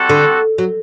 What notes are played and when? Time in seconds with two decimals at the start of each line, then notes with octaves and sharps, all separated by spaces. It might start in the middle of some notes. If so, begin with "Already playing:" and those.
Already playing: G3 C4 F#4 A4
0.09 D3
0.58 F#3